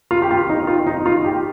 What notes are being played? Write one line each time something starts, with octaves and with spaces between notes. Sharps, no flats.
F4
G4
F4
D#4
F4
D#4
F4
G4